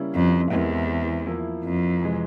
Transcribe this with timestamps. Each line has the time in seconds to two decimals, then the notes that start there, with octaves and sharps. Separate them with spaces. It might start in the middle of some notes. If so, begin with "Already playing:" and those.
Already playing: C#3 G3 A#3 C#4 E4
0.14 F2
0.51 E2 E3 G#3 C4 G4 A#4
1.26 F3 A#3 E4
1.64 F2
2.02 C3 E3 G#3